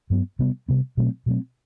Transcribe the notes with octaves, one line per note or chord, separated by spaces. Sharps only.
G2 F#3 B3
C3 G3 B3
C3 G3 B3
B2 F#3 A3 C4
B2 F#3 A3 C4